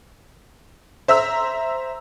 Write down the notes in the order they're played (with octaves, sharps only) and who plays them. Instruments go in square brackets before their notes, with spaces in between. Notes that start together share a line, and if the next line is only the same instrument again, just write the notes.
[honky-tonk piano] C5 E5 A#5 E6